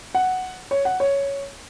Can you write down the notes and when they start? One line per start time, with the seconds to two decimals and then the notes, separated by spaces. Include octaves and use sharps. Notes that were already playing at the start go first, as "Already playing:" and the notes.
0.15 F#5
0.71 C#5
0.85 F#5
1.00 C#5